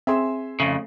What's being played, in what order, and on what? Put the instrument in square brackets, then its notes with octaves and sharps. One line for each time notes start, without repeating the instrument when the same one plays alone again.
[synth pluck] C4 G#4 E7 [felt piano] E5 G#5 C6
[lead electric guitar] F2 C#3 [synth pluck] A3